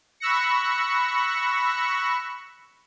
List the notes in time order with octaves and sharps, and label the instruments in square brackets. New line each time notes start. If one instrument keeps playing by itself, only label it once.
[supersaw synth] B5 C#6 E6 F#6 A#6 C#7